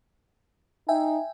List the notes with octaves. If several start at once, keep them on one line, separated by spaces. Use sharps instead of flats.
D#4 E5 G5 G#5